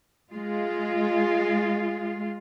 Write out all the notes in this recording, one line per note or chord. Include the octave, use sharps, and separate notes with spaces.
G#3 F4